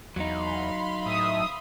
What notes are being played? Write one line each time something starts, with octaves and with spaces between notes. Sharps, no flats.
E2 F#3 D#4 F5 B5 C6
A2 E5 D#6